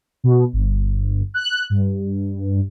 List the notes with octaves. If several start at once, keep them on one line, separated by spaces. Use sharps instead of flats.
B2
G1
F#6
G2